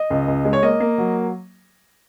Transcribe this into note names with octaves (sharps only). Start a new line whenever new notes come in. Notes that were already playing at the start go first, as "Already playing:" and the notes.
Already playing: D#5
C#2
C#2
G#3
C#5
A#3 D#5
A#3
F#3